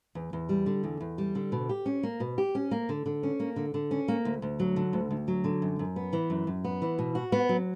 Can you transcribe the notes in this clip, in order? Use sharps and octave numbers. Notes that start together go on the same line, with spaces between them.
E2
E2
G3
D3
E2
E2
G3
D3
B2
G4
C#4
A#3
B2
G4
C#4
A#3
D3
D3
C#4
A#3
D3
D3
C#4
A#3
D2
D2
F#3
D3
D2
D2
F#3
D3
F#2
F#2
B3
E3
F#2
F#2
B3
E3
B2
F#4
B3
F#3